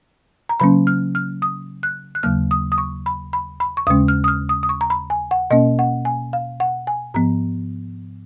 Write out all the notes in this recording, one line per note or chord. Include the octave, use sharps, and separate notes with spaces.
A#5
C#3 F#3 A#3 C#4 B5
F6
F6
D#6
F#6
F#6
D#2 C#3 F#3 A#3 F6
D#6
D#6
C#6
B5
B5
B5
C#6
D#2 C#3 G#3 C#4 D#6
F6
D#6
F6
D#6
D#6
C#6
A#5
B5
G#5
F#5
B2 A#3 C#4 D#5
F#5
G#5
F5
F#5
G#5
G#2 F3 B3 A#5